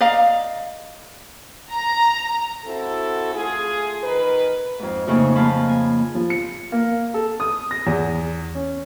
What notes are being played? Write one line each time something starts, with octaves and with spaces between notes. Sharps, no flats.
D5 D#5 F5 A#5
A#5
C4 E4 F#4 A4
A3 F4 G#4
D#3 A#4 B4
F2 G#2
F2 C#3 A3 A#3 C#4 D#4
F3 A#3 F4 A5 B5
G#5
F3
C#7
A#3
A4
D#6
A#6
E2
C#4